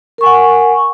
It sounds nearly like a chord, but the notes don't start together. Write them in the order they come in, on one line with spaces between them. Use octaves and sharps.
A#4 C#6 G#5 F#5